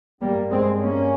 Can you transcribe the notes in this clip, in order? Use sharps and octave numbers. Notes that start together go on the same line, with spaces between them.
G2 G3 A#3
G#3 C4
A#3 C#4